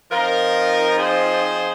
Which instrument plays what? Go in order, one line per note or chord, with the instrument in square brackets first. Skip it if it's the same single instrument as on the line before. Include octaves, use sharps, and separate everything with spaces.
[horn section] F3 C4 D#4 F4 A#4
G#4 C5